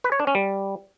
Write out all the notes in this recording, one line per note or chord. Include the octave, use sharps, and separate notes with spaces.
B4
C#5
D4
C#4
G3